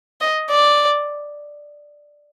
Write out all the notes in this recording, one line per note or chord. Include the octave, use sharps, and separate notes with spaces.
D#5
D5